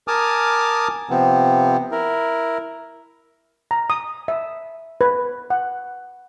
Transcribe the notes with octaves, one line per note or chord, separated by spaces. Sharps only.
A#4 G#5 A5 D6 D#6 F6
C3 F3 B3 C4
E4 A#4
A#5
D#6
E5
B4
F#5